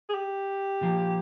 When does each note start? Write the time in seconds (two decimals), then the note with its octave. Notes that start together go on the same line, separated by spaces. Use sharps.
0.09 G#4
0.14 G4
0.81 A#2 F3 A#3